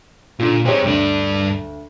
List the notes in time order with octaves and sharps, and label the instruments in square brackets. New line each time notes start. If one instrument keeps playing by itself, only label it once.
[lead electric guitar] A#2 [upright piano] D3 F4
[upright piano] C4 G4 C#5 [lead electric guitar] G#4 C5
[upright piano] D2 [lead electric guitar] G2 D5